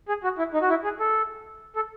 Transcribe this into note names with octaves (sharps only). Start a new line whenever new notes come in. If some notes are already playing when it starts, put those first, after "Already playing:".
G#4
F#4
E4
D#4
F#4
E4
G#4
A4
A4